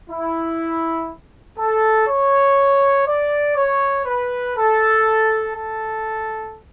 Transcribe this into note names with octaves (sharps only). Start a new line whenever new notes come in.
E4
A4
C#5
D5
C#5
B4
A4
A4